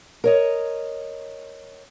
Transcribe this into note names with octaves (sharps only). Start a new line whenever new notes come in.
A#4 C#5 D#5